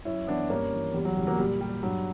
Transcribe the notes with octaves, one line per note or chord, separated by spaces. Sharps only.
F#2 C#4 E4
E3 B3 D4
G2 A#3 C#4
E3
E2 G3
F#3
C#3 E3 G3
F#3 A#3
A#2 G3
G3
G2 F#3